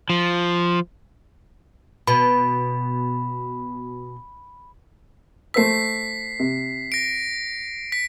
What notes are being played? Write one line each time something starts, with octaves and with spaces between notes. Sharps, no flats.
F3
B2 B5
A3 C5 E6 B6 C7
C3
A#6 D7
B6